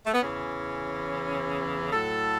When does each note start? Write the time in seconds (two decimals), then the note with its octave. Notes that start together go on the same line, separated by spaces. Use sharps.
0.06 A3
0.13 B3
0.22 E2 C#3 E3 C#4
1.92 A2 F#3 A4